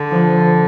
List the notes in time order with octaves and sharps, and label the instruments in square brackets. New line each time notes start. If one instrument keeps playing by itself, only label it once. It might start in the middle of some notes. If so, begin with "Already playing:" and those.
Already playing: [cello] D3
[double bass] F3